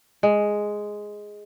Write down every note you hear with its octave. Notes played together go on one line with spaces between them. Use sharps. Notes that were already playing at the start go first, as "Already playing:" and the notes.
G#3